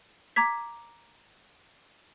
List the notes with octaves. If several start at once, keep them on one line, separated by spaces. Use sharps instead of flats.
A#5 D6 G#6 B6